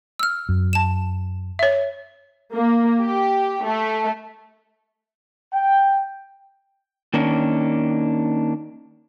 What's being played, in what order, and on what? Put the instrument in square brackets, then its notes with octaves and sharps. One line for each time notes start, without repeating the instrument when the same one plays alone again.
[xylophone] E6 F6
[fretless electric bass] F#2
[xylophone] A5 E7
[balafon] C#5 E5
[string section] A#3
G4
A3
[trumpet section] G5
[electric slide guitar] D#3 A#3 C#4 D4